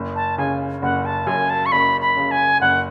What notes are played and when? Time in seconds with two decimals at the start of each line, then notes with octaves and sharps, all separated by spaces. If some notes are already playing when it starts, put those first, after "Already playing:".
Already playing: F#1
0.16 A5
0.38 C#3 G#5
0.82 F#1 F#5
1.05 A5
1.27 F#2 G#5
1.50 A5
1.66 C#6
1.72 F#1 B5
2.01 B5
2.17 C#3
2.31 G#5
2.61 F#1 F#5